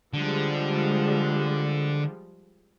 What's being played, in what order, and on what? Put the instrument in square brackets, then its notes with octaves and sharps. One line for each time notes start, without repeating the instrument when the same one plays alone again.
[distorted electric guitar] D3 [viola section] F3 G3 G#3